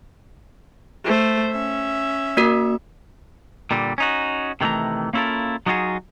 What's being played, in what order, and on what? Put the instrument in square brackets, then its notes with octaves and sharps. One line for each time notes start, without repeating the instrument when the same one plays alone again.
[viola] A3 C5
C#4 E5
[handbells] A#3 F#4 A#4
[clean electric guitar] A#2 D3 G3
C#4 D#4 F#4
C3 D#3 E3 A3 A#5
A#3 C#4 E4 F4 A4 A#4
F#3 D#4 F4 F#4 G#4